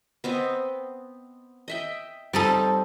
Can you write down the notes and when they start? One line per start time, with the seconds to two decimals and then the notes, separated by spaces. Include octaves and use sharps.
0.24 B3 C4 D#5
1.68 D#5 E5 G5
2.33 G3 C4 D#4 A4